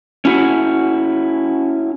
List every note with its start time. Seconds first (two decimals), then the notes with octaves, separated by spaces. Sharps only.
0.25 C#4 E4 F#4